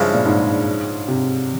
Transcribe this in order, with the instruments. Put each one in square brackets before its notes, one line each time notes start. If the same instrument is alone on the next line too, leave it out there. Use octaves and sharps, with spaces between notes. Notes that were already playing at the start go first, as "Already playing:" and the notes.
Already playing: [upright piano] G2 [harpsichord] C#3 F3 G#3 C#4 E4
[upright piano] A#2
G#2
C3